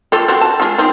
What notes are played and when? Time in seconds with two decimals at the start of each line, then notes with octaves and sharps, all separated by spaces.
0.12 F4 G4 A4
0.28 C4 F#4
0.41 A5
0.60 G#3 F4 G#4
0.78 C4 D#4